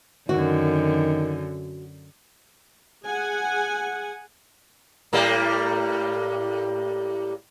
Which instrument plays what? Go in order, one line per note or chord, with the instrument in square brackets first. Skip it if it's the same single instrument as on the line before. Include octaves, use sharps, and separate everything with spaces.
[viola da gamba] F#2 D3 [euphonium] D#3 [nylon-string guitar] F#4
[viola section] G#4 F#5 G#5
[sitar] A2 G3 A#3